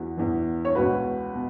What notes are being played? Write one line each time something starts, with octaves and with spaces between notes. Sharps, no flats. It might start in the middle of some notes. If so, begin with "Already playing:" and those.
Already playing: E2 E3 F#4
E2 E3
C#5
C#2 B2 F#4 B4
B2